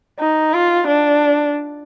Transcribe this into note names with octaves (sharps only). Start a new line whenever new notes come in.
D#4
F4
D4